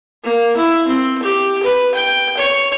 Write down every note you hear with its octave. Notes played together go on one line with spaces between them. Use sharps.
A#3
E4
C4
G4
B4
G5
C#5